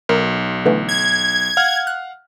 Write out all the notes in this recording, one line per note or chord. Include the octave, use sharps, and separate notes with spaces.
B1 A#4
D3 E3 A3
G#6
F5 F#5 F6
F#6